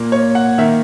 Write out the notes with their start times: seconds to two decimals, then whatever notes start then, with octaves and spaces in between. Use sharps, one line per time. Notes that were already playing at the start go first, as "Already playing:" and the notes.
Already playing: A#2 A#3
0.12 C#5
0.35 F#5
0.58 D#3 A#3 E5